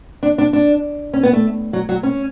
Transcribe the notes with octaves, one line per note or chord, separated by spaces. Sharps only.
D4
D4
D4
C#4
B3
A3
F#3
F#3
C#4